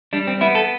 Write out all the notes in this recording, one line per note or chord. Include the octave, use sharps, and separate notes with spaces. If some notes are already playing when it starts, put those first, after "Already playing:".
G3 D4
C4
B3 E4
A4